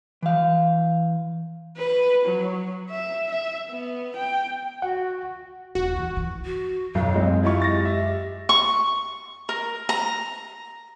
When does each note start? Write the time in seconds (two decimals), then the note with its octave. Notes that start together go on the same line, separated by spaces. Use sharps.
0.22 E3 F5
1.77 B4
2.25 F#3
2.90 E5
3.31 E5
3.70 B3
4.16 G5
4.82 F#4 F#5
5.75 D#1 F#4
5.97 E3
6.17 E3
6.45 F#4
6.95 B1 F#2 F#3
7.16 G#3 C4
7.43 E4 F4 G4 C#6
7.62 A6 A#6
7.85 E5
8.49 C#6
9.49 A#4
9.89 A#5